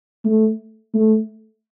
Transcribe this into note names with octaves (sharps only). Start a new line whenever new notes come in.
A3
A3